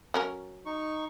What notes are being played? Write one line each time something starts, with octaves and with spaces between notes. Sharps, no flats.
F#3 C#4 A#4
D#4 C#6